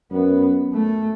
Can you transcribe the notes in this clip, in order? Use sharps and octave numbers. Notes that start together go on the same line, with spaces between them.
F#2 B3
A3